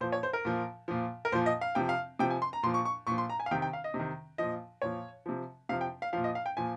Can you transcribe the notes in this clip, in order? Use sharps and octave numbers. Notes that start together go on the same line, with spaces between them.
A#2 F3 C5
C#5
C5
A#4
A#2 F3
A#2 F3
A#4
A#2 F3 C5
D#5
F5
C3 F3 G5
F5
C3 F3 G5
G#5
C6
A#5
A#2 F3 C6
C#6
C#6
A#2 F3 C#6
C6
A#5
G#5
F5
C3 D#3 G5
G5
F5
D#5
C3
D#3
A#2 F3 D#5
A#2 F3 C#5
C3 F3
C3 F3 F5
G5
F5
A#2 F3 F5
D#5
F5
G5
A#2 F3 G#5